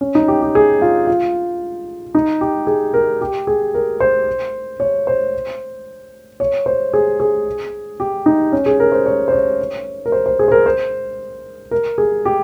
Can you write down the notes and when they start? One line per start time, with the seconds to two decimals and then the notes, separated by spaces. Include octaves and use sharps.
0.01 C#4
0.15 D#4
0.28 G4
0.42 G4
0.55 G#4
0.82 F4
1.07 F4
2.15 D#4
2.41 G4
2.67 G#4
2.94 A#4
3.21 G4
3.47 G#4
3.74 A#4
4.00 C5
4.80 C#5
5.07 C5
6.40 C#5
6.66 C5
6.94 G#4
7.20 G#4
8.00 G4
8.26 D#4
8.52 C#4
8.66 G#4
8.80 A#4
8.92 C5
9.06 C#5
9.28 C5
9.32 C#5
10.06 A#4
10.12 C5
10.26 C5
10.39 G#4
10.48 C5
10.52 A#4
10.66 C5
11.71 A#4
11.98 G#4
12.25 G4